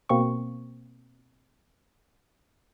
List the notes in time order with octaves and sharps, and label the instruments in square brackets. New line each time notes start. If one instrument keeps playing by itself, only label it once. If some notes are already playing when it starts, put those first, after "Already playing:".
[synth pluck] B2 A#3 C4 C#6